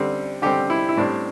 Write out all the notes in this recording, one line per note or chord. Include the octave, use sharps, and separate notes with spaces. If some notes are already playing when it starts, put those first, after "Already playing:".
Already playing: D3 G3 C4
D3 G3 C4 G4
E4
E4
A2 G3 C4 D4